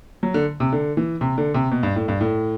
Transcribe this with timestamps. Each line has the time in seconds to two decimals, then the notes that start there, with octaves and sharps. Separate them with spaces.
0.23 F#3
0.34 D3
0.60 C3
0.72 D3
0.97 E3
1.21 C3
1.38 D3
1.54 C3
1.72 B2
1.83 G2
1.96 A2
2.08 G2
2.21 A2